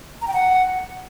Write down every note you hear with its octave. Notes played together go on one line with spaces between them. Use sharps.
A#5
G5
F#5